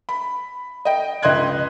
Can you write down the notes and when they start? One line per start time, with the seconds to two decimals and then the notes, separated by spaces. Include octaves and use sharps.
0.09 B5
0.85 D#5 G5
1.22 C#2 D#5 C6 F#6 G#6